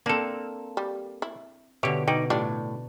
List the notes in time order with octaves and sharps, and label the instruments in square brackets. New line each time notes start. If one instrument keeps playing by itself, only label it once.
[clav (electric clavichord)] A#3 A4 [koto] C4 D4
[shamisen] G3
E4
[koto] B2 D3 [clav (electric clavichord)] G4 C#5 [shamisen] E5
[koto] B2 [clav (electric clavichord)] D#4 D5 [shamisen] G5
[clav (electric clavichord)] A2 [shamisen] G3 F4 [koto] D4